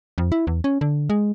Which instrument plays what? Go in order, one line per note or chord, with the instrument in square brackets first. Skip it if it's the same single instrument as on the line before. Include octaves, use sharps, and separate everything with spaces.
[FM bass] F2
E4
E2
C#4
D3
G#3